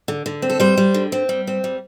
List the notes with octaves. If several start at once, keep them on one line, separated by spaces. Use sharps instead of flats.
D3
D3
C4
A4
G3 C5
G3
D3
C4
G3
C4
G3